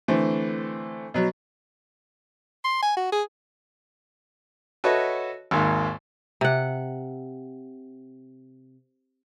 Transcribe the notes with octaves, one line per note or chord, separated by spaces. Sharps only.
D3 E3 A3 C4
B2 F#3
C6
G#5
F#4
G#4
F#4 A4 B4 C#5 D#5 E5
G#1 D#2 G#2 A#3
C3 F#5